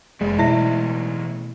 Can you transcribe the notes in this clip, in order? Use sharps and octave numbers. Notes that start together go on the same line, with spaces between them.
F1 E3 G#3 A3 D5
B2 E4 E5